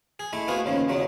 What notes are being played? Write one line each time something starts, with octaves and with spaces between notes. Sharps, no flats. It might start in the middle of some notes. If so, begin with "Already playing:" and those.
G#4
G#3 A3 E4
B3 F4 F#4 G#4 C5
D#2 C#3 F3
E2 F#3 G#3